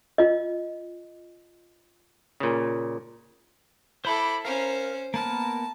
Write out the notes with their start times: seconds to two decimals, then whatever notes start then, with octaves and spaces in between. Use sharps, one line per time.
0.18 F4 D#5
2.40 A#2 C#3
4.05 E4 A4 C5 B5 D6
4.45 C#4 A#4 C5 F5
5.14 A#3 B3 A#4 A5